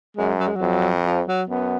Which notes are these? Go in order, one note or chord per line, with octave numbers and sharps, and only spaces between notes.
F#2 G#3
F#3
G#3
F#3
F2
F3
F#3
F#2 B3